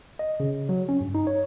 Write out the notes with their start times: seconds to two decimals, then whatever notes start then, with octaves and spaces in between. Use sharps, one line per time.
0.19 D#5
0.40 C#3
0.69 F#3
0.89 C#4
1.01 G2
1.15 D#4
1.27 C#5